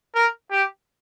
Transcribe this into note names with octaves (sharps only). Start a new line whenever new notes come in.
A#4
G4